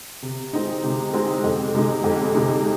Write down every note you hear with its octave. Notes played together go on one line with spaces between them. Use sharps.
C3
G#3 C4 D#4
C3
G#3 C4 D#4
F2
C3 G#3 D#4
F2
C3 G#3 D#4